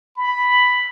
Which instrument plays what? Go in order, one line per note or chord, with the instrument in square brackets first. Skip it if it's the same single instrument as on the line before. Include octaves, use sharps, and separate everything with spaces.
[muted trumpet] B5